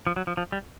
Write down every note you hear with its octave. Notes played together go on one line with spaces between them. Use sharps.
F3
F#3
F3
F3
G3